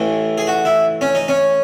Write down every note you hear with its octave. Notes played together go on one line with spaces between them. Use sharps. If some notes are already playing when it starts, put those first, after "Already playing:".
Already playing: A1 A2 E3
G#4
F#4
E4
C#4
D#4
C#4